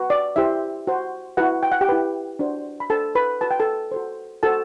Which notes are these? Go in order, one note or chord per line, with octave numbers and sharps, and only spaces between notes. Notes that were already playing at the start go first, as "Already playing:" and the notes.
Already playing: F#4 B4
D5
E4 G4 C5 E5
F#4 C5
E4 F#4 B4 F#5
G5
F#5
G4 G5
E4 B4
D4 F#4 C5
B5
D4 A4 C5 A5
B4 B5
F#4 B4 A5
G5
A4 A5
F#4 A4 C5
F#4 A4 C5 A5